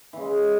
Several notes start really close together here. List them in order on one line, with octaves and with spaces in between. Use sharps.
E3 C#3 G#3